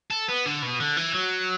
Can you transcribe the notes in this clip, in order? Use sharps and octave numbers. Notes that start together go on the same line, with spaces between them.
A4
B3
D3
B2
D3
E3
F#3